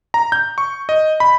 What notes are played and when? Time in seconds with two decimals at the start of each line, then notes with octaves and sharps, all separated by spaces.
0.14 A#5
0.32 G6
0.58 C#6
0.89 D#5
1.20 B5